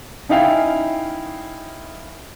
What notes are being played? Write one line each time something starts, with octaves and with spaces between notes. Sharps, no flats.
C#4 D#4 E4 F5 G5 G#5